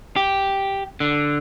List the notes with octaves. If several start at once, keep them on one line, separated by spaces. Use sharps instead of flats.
G4
D3